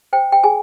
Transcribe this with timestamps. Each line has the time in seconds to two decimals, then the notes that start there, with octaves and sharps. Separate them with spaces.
0.13 C5 G5
0.32 G5
0.44 G#4 G#5